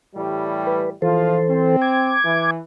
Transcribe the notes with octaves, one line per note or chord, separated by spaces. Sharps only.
A2 E3 G3
B4
A#1 E3 F3 F4 A4 C5
C4
D6 G#6
E3